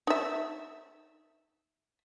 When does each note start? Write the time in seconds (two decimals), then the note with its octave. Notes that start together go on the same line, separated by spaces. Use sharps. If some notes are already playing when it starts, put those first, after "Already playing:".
0.07 D#4 E5